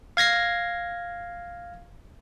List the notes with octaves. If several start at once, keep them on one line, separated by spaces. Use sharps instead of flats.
F5 G#6 A#6 C7